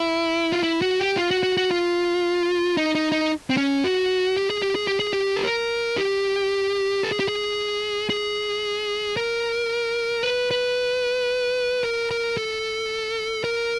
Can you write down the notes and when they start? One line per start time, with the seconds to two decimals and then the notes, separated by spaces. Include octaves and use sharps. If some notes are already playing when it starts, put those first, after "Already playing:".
Already playing: E4
0.52 F4
0.63 E4
0.82 F#4
0.99 G4
1.17 F4
1.31 F#4
1.43 F#4
1.57 F#4
1.71 F4
2.77 D#4
2.95 D#4
3.12 D#4
3.50 C4
3.57 C#4
3.84 F#4
4.37 G4
4.50 G#4
4.62 G4
4.75 G#4
4.87 G4
5.00 G#4
5.13 G4
5.36 A4
5.44 A#4
5.97 G4
7.03 A4
7.11 G#4
7.20 G4
7.28 G#4
8.10 G#4
9.17 A#4
10.23 B4
10.51 B4
11.84 A#4
12.11 A#4
12.37 A4
13.44 A#4